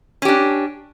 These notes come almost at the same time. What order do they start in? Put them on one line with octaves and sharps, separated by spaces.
C#4 G4 D4